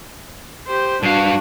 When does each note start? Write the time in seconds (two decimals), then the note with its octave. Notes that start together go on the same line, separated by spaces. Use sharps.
0.67 G4 C5
1.03 G2 D4 F#4 F5